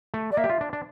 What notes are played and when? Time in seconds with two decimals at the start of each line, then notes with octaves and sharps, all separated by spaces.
0.14 A3
0.32 D5
0.37 A#3 E5
0.44 G4
0.50 F4
0.61 D4
0.73 D4